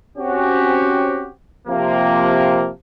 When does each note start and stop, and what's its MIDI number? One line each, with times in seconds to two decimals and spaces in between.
0.18 1.29 60
0.18 1.29 61
0.18 1.29 66
0.18 1.29 67
1.67 2.70 48
1.67 2.70 53
1.67 2.70 58